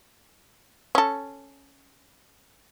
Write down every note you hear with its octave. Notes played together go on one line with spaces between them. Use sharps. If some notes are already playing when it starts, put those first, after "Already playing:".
C#4 A4